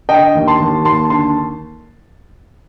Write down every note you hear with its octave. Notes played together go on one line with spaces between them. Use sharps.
D3 D#5 G5
D#2
A5 C6
D#2
D#2 A5 C6
D3 A5 C6